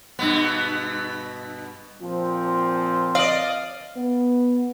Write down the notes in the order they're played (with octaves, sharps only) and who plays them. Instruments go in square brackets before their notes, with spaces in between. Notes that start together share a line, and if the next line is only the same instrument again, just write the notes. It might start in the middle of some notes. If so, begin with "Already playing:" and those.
[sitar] G2 B2 B3
[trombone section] A#2 F3 C4
[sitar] D5 D#5 [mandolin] F5
[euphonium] B3